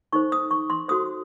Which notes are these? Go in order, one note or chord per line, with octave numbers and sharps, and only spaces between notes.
D#4 A4 C5 C#6
D#6
C#6
C6
F#4 A4 C5 D#6